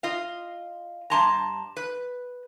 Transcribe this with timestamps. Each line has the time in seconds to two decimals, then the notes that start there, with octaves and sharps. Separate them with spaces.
0.03 F4 D#5 F5
1.10 G2 A5 A#5 C6 G#6 A#6
1.77 B4